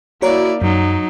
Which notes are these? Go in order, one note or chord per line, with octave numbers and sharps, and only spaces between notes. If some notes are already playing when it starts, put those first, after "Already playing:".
A#3 E4 F#4 C#5 D5 A#5
F#2 F#3 D#4